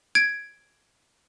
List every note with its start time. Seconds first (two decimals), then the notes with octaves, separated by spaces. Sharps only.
0.15 G#6 D7